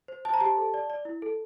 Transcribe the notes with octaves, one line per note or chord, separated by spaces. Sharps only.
C5
C5 A5
A#5
G4 A5
A4
D5
D5
E4
A4